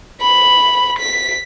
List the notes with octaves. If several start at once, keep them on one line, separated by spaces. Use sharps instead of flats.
B5
B6